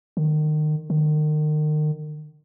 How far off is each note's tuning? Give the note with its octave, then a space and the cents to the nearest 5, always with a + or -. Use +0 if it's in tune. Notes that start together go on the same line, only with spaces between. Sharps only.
D#3 -30
D#3 -35